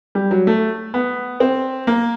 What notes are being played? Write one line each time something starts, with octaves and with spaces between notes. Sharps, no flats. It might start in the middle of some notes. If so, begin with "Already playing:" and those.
G3
F#3
A3
B3
C4
A#3